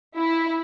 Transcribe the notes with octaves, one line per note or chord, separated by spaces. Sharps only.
E4